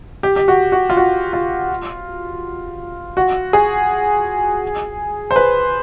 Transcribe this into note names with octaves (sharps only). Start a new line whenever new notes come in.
G4
G4
F#4
F#4
F4
F#4
F4
F#4
G#4
C5
B4